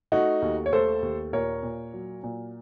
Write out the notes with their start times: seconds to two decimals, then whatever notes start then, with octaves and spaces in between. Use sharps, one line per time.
0.12 A3 D#4 F#4
0.42 D#2
0.66 C#5
0.73 A3 A4 C5
1.02 D#2
1.33 A#2 A#4 C#5
1.63 A#2
1.94 F#3
2.23 A#2